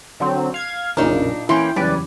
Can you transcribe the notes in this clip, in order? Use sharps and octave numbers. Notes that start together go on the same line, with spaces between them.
D3 F#3 C4
F5 G#6
B1 F#2 A#2 C#3 D4 D#4 A#4
E3 A#3 C#4 E4 G5 C6
F#1 E2 G3 C#4 B4 D5